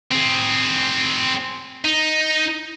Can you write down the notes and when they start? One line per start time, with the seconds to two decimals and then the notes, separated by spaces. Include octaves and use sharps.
0.12 C4 G#4
1.85 D#4